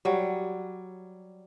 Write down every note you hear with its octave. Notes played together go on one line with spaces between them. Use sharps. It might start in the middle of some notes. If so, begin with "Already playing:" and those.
F#3 G3